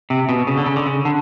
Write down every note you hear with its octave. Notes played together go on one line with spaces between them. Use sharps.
C3
B2
C#3
D3
C#3
D3
C#3
D3